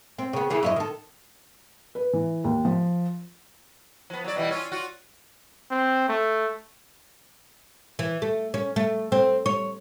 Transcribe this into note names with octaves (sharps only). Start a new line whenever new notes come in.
C4
C#3 B3
C#3 E3 G#4
F#2 E4 D#5
D#3 A4
B4
E3
D#2
F3
F3 B3
F#3 D5
B2 E3 G3
C#4 F4
F4 F#4
C4
A3
E3
A3
C#4
A3
C4
C#5